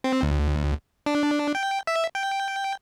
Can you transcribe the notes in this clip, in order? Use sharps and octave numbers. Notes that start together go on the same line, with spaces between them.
C4
D2
D4
G5
E5
G5